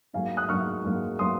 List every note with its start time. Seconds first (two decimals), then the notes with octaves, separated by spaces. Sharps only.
0.13 G#2 F#3 A#3 F5 G#5
0.37 D#6 F#6
0.49 G#2 F#3 A#3 C#6 F6
0.84 G#2 F#3 A#3
1.19 F#3 A#3 C6 D#6